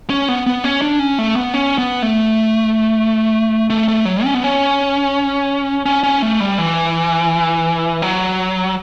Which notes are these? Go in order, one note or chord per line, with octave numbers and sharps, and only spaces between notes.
C#4
B3
B3
C#4
D4
C#4
A3
B3
C#4
B3
A3
A3
A3
F#3
C#4
B3
C#4
C#4
C#4
A3
G3
E3
F#3